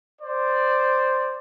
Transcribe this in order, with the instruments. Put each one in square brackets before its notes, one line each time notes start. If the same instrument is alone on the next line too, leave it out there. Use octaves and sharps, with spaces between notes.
[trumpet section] C5 D5